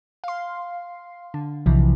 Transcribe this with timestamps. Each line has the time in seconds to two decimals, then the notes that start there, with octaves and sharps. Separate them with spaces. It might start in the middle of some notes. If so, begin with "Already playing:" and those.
0.24 F5 C6
1.34 D3
1.66 B1 C3 E3 F3